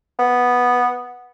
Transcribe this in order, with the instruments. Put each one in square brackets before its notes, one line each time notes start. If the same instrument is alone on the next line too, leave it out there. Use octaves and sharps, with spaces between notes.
[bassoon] B3